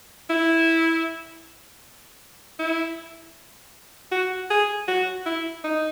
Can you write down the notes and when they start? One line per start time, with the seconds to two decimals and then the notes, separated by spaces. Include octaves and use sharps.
0.30 E4
2.59 E4
4.12 F#4
4.51 G#4
4.88 F#4
5.26 E4
5.64 D#4